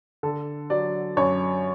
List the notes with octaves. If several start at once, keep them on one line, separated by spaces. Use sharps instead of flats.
D3 A4
F#3 D5
F#2 C#5